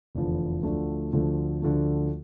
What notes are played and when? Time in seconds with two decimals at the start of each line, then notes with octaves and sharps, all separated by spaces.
0.15 F1 E2 D3 F3
0.63 D2 D3 F3 A3
1.13 D2 D3 F3 A3
1.62 D2 D3 F3 A3